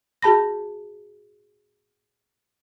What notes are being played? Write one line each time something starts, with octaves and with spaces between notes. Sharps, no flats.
F#4 G#4 A5 B5 A#6